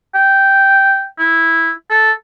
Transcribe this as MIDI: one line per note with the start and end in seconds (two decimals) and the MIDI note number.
0.15 1.05 79
1.19 1.70 64
1.90 2.11 69